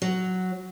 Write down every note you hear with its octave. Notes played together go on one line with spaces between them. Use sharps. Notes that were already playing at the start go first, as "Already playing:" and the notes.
F#3